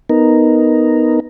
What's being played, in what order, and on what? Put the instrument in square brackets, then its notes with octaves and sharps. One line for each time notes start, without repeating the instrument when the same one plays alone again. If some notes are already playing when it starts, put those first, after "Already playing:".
[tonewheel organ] B3 D#4 A#4